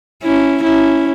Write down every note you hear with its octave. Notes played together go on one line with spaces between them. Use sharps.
C#4 E4
C#4 E4